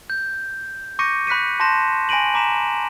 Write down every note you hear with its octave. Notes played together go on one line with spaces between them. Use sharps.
G6
C#6 D6 G6 A#6 C#7 D#7
B5 F#6 B6 C#7 D#7
A5 B5 C6 G6 A#6 E7
G#5 B5 A#6 D7 D#7 F#7
A#5 D6 B6 E7